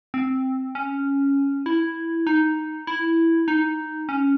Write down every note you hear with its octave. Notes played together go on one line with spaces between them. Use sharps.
C4
C#4
E4
D#4
E4
D#4
C#4